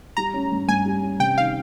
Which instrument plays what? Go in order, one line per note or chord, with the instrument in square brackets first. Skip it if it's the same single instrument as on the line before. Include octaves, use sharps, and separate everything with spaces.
[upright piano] G3 [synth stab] A#5
[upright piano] C#4
G2
[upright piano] G2 [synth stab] G#5
[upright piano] G3
C#4
[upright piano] C3 [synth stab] G5
[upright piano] D#3 [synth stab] F5